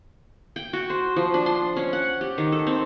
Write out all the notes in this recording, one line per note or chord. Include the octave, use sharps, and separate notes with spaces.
G5
F#4
C5
F3
D4
C6
C#4
F#5
G4
D#3
A4
C4